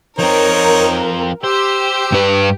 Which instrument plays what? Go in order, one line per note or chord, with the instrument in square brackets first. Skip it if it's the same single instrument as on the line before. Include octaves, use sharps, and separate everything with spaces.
[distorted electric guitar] F3 C4 [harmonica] D#4 C#5 [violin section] A#4
[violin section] G4 [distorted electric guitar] C5 [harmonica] E6
[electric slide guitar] G2 B4